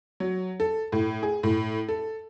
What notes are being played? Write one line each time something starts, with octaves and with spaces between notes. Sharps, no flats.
F#3
A4
A2
G#4
A2
A4